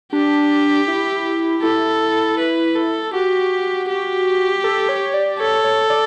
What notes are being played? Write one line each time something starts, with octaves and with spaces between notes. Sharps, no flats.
D4 G4
E4
E4 A4
B4
A4
F#4 G4
G4
A4
C#5
D5
A4 C#5
C#5
D5